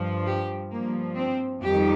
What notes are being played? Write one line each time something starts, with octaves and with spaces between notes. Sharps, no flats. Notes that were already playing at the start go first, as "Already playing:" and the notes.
Already playing: G2 F3
G4
G2 F3 A#3
C4
F2 D#3 G3 G4